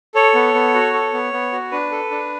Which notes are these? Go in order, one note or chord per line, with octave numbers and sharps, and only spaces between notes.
A4 C#5
B3
B3
F#4
A4
B3
B3
F#4
D4 B4
A4
D4